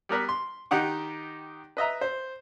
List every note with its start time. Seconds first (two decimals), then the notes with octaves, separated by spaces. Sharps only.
0.09 G3 B3 A#4 B4
0.29 C6
0.71 D#3 D#4 G4 F#5 D6
1.77 B4 D#5 E5 A#5
2.01 C5